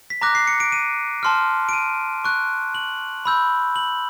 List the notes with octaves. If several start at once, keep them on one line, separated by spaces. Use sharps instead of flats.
B6
A#5 D6 F#6 A#6
C7
C#7
D7
D#7
A5 C6 F6
D7
D#7
C#6 F#6
F#7
B5 E6 G6
F#7